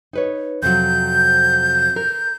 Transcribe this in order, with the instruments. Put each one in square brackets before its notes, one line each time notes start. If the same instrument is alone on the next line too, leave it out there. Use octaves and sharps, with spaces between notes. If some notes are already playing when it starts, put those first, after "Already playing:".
[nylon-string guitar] D#4 B4 C#5
[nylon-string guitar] F2 C3 F#3 [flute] G6
[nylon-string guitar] A#4